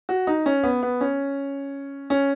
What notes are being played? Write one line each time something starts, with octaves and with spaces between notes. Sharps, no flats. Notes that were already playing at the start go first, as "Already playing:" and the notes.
F#4
D#4
C#4
B3
B3
C#4
C#4